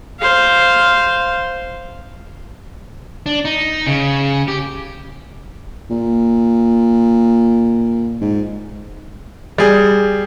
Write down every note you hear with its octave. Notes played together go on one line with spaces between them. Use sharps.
C5 F5
D4
D#4
C#3
G4
A#2
G#2
G3 G#4